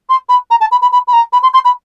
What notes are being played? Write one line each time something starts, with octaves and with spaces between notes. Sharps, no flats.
C6
B5
A#5
A5
B5
B5
B5
B5
A#5
B5
C6
C6
B5